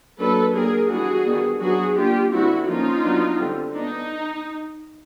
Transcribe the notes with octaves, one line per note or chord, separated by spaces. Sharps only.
F#3 A#3 D4 A4 B4
F#3 A#3 D4 G#4 A#4
E3 G3 B3 D4 F#4 G#4
D#3 G3 B3 D4
F#3 B3 D4 F#4 G#4
G3 A#3 D4 F4 G4
D3 G3 C4 E4 F#4
F3 A#3 C#4 D#4 F4
F#3 B3 D4
D3 G3 C4
B3 D4 D#4